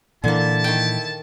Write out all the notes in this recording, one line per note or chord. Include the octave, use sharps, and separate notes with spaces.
A#2 D3 E3 A#3 E4 A5
D#3 G5